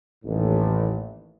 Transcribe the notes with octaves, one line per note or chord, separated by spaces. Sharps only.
A1 D#2 A2